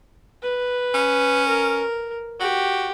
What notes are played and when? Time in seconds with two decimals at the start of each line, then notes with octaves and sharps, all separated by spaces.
0.43 B4
0.94 C#4
1.48 A#4
2.40 F#4 G4